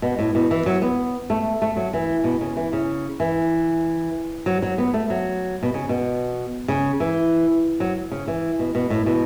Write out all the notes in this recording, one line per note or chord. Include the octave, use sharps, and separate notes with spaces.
B2
A2
B2
E3
F#3
B3
A3
A3
F#3
E3
B2
C#3
E3
C#3
E3
F#3
F#3
B3
A3
F#3
B2
C#3
B2
C#3
E3
F#3
C#3
E3
B2
B2
A2
B2